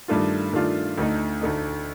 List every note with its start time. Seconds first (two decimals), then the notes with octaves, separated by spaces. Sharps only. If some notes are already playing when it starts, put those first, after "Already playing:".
0.08 G2 D#3 A3 D4 F4
0.53 G2 D#3 A3 D4 F4
0.97 D2 D3 A3 D#4
1.41 D2 D3 A3 D#4